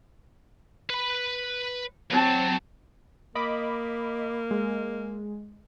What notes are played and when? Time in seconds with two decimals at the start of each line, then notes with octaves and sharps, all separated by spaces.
0.90 B4 B5
2.11 F#3 C4 A5
3.35 A#3 D#5 B5 D6
4.51 G#3